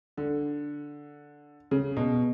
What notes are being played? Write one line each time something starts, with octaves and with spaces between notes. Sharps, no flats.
D3
C#3
B2